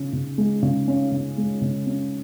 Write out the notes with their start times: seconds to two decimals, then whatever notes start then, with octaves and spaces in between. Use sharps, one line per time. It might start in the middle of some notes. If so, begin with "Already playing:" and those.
Already playing: C#3 C#4
0.13 C#3
0.38 G#3
0.62 C#3
0.87 C#4
1.12 C#3
1.37 G#3
1.61 C#3
1.86 C#4